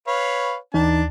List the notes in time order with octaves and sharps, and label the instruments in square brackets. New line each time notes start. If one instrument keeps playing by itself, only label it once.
[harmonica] B4 C#5 F5
[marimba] D#2 [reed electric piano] E3 D#4 [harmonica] D4 A5